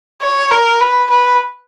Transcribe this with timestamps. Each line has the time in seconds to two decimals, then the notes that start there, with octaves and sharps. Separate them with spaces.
0.22 C#5
0.51 A#4
0.81 B4
1.10 B4